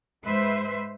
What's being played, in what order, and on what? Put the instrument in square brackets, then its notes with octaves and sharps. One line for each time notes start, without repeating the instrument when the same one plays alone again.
[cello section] G#2 G#3 B4 C5 E5